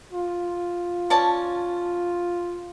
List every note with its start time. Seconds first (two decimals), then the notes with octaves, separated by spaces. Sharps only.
0.13 F4
1.10 C#4 D5 A5